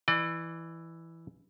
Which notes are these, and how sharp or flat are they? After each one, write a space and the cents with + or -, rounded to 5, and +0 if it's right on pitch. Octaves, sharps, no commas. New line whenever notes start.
E3 +0 D5 +40